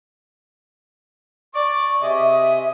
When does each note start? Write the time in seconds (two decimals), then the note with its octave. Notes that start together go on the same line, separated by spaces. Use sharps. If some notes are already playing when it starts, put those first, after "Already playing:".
1.55 D5 C#6
2.02 C3 G#4 D#5 E5